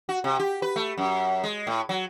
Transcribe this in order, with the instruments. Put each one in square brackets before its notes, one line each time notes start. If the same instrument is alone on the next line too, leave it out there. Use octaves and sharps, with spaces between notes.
[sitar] F#4
C3
G4
B4
A3
F#2
G#3
A2
F#3